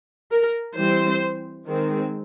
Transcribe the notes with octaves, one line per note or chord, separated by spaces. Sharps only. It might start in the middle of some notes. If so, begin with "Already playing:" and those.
A#4
E3 G3 C4 C5
D#3 G#3 C4